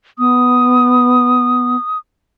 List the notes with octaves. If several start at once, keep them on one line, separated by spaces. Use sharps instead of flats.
B3 D#6